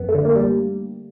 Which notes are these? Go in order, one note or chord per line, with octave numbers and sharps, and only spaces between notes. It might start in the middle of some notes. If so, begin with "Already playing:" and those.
Already playing: F#2 B3
A3
D3
A#3
G3